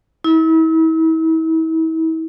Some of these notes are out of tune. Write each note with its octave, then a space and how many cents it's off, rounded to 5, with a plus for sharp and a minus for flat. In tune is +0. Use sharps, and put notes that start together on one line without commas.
E4 -40